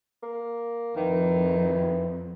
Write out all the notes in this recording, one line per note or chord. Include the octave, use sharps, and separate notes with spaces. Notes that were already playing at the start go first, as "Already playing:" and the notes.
A#3
F2 D#3 E3